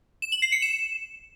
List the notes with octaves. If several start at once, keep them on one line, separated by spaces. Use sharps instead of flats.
E7
F#7
C7
C#7
E7